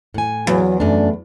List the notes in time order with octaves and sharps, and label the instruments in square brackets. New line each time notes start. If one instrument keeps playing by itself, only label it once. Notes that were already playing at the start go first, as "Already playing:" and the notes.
[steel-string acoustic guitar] A2 G#5
[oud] E2 [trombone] F#3
[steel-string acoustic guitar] F#2 D4 [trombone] A3